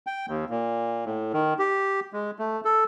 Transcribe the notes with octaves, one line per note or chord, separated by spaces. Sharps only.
G5
D#2
A#2
A2
D#3
G4
G#3
A3
A4